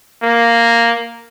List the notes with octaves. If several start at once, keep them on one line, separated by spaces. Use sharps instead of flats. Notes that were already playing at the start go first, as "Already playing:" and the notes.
A#3